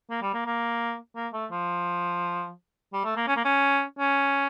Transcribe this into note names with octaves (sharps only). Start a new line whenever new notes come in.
A#3
G3
A#3
A#3
A#3
A3
F3
G3
A3
A#3
C#4
A#3
C#4
C#4